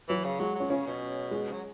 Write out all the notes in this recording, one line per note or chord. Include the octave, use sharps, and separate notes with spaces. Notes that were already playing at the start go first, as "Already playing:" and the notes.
E3 F#3
C#3
F#3 G#3
F#3
C#4
C#3 C#4
B2
G#3
F#3